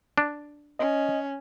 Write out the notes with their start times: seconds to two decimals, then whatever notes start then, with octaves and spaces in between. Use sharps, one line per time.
0.18 D4
0.79 C#4 D#5